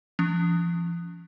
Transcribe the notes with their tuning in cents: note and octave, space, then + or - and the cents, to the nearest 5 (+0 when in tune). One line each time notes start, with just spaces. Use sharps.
F3 -35 C#4 +35